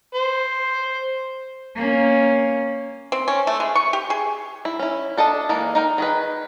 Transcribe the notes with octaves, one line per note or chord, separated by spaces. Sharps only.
C5
A#3 C#4
C4
C#4
A3
G#3
C#6
G4
G#4
E4
C#4 E4
D4 A4 D#5 A5
E3 G#3 A#3
D#4 A#4 G5
D#3 G#4 B4